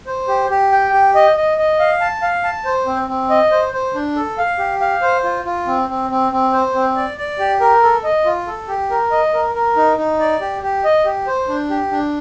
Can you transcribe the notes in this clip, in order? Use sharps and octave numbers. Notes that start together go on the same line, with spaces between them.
C5
G4
G4
G5
G4
D#5
D#5
D#5
F5
A5
F5
A5
C5
C4
C4
D#5
C5
C5
D4
A4
F5
G4
F5
C5
F4
F4
C4
C4
C4
C4
C5
C4
D5
D5
G4
A#4
A4
D#5
F4
A4
G4
A#4
D#5
A#4
A#4
D#4
D#4
D5
G4
G4
D#5
G4
C5
D4
G4
D4